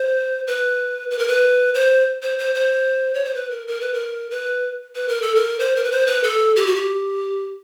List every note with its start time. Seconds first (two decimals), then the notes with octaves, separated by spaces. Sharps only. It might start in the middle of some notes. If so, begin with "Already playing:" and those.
Already playing: C5
0.47 B4
1.11 B4
1.19 A#4
1.28 B4
1.75 C5
2.23 C5
2.39 C5
2.55 C5
3.14 C#5
3.25 C5
3.35 B4
3.51 A#4
3.67 A#4
3.81 B4
3.94 A#4
4.31 B4
4.95 B4
5.08 A#4
5.22 A4
5.35 A#4
5.60 C5
5.76 A#4
5.84 B4
5.92 C5
6.07 B4
6.24 A4
6.56 G4
6.66 F#4
6.76 G4